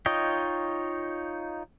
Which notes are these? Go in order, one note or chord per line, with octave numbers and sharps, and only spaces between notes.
D#4 F4 C#5 D#5 G5